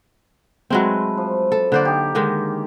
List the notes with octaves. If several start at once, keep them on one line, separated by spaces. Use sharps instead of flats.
F#3 G#3 A3 C4 B4
F3
A4
D3 A#3 C5 D5 F#5
D#4 G4
D3 D#3 G#3